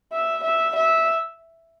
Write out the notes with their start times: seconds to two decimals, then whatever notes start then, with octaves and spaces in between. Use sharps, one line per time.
0.13 E5
0.44 E5
0.76 E5